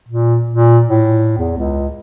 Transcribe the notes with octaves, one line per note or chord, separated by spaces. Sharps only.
A#2
A#2
A2
E2
C#2